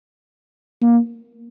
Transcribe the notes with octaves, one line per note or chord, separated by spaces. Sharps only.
A#3